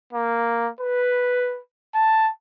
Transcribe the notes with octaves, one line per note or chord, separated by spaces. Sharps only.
A#3
B4
A5